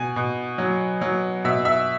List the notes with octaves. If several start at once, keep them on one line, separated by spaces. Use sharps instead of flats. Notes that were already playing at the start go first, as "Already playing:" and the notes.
Already playing: B2 G#5
B2
F#3
F#3
B2 E5
E5